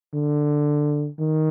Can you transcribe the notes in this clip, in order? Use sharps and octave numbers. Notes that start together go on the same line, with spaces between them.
D3
D#3